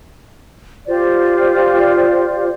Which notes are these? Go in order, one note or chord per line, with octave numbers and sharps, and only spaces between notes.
F4 G4 C5 D5